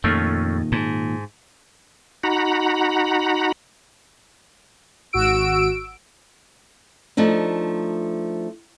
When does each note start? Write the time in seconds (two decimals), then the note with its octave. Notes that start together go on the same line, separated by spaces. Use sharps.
0.04 F2 A#2 D#3 A3 C#4 F4
0.72 G#2 A5
2.23 D#4 F#4 F#5 A#5 B5
5.13 G#1 F#4 E6 D7
7.17 F3 A3 D4 D#4